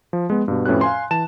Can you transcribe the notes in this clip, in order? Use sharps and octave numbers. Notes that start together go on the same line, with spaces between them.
F3
G#3 B3
G2 B2
F2 A2 C#4 F#4 B4 F#6
F5 G#5 C6
E3 A5 E7